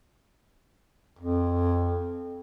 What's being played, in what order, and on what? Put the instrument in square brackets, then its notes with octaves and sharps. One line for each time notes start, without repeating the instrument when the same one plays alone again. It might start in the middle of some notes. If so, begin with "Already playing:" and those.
[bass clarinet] F2